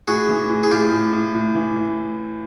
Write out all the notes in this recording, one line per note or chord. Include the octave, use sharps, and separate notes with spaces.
A2 F#4 G#4
E3
A2
G#4
A2 F4 G4
A2
A2
A2
E3
A2